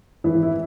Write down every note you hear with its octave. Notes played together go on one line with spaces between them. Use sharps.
G#1 E3 E4
E4